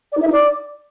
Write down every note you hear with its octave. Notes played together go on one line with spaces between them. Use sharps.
D5
D#4
E5
D#4
D5